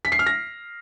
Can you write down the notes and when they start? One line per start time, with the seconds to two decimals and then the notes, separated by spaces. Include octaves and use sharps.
0.05 B6
0.12 C7
0.19 F6
0.26 A#6